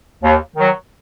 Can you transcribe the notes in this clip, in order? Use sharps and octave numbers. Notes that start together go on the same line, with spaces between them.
D#2
D#3 F#3